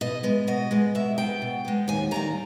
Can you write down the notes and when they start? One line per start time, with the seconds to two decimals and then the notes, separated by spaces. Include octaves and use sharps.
0.01 B2 D#5
0.23 G#3 B3
0.47 B2 D#5
0.71 G#3 B3
0.95 B2 E5
1.18 G#3 B3 G5
1.42 B2
1.65 G#3 B3
1.88 D#2 G#5
2.11 D#3 G3 A#3 A#5